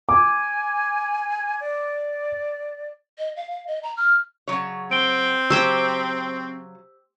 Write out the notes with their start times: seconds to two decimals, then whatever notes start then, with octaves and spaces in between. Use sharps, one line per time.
0.09 G#5 D6
1.60 D5
3.19 D#5
3.36 F5
3.51 F5
3.67 D#5
3.83 A#5
3.97 F6
4.48 C#3 F#3 C#5
4.91 C4 D7 G7
5.50 C#3 F#3 G4 C5 G5 E6